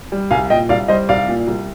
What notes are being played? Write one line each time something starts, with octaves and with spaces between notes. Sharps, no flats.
G3
C2 F5 G#5
A#2 D#5 G5
C2 D5 F5
G3 C5 D#5
C2 D5 F5
A#2
C2